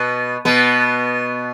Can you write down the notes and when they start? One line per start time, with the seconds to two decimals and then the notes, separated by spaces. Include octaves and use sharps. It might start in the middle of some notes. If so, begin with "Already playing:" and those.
Already playing: B2 B3
0.45 B2 B3